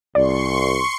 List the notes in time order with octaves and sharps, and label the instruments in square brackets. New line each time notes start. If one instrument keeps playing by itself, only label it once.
[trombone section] C2 [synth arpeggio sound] D5 [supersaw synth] C6 C#6 C#7